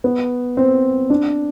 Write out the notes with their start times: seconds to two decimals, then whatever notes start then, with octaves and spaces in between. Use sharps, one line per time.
0.04 B3
0.57 C4
1.10 D4